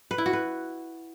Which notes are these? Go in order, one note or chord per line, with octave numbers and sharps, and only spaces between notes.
B4
E4
F#4
B4